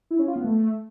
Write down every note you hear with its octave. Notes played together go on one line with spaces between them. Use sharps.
E4
C#4
F4
B3
A3